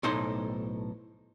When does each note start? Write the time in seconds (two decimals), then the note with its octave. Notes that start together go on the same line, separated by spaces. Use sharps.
0.03 B1 A2 D#4 A4 C5